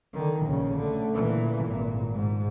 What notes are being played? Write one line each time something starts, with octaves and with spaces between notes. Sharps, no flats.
D3 D#3
A#1 C#3
D3 A3
A#2 E3
G#1 A#2
G#2